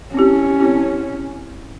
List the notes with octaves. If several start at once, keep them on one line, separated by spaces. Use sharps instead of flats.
C4 C#4 E4 G4
C4 E4 G4